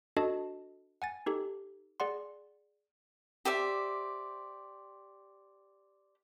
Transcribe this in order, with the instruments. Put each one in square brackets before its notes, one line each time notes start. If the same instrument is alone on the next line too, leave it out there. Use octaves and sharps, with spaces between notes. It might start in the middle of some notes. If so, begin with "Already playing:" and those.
[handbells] D4 F#4 A4 D#5 A5
F#5 G#5 A6
D#4 G4 A4
G#4 D5 F#5 C6
[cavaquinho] G4 C5 D5 E5